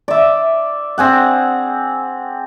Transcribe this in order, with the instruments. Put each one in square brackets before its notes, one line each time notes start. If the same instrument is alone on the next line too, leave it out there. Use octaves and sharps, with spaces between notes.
[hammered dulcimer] D5 E5
C4 G#4 F#5